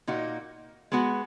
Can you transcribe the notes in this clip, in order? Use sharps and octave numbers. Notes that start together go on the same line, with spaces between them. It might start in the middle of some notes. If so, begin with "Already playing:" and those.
A#2 A#3 D#4 F#4
G#3 B3 F#4